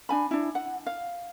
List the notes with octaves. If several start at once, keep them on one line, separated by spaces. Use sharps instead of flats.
D4 G#5 B5
D4 E4
F#5
F5